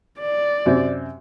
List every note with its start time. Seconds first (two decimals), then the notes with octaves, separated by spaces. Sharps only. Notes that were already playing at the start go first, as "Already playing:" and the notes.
0.20 D5
0.66 F#2 C3 C4